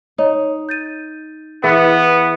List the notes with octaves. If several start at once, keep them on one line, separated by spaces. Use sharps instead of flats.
D#4 C#5
G6 A6 D#7
E3 B3 G#4 B5 D#6